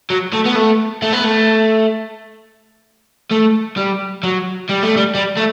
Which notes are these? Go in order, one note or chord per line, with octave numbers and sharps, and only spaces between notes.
F#3
A3
B3
A3
A3
B3
A3
A3
G3
F#3
G3
A3
G3
G3
A3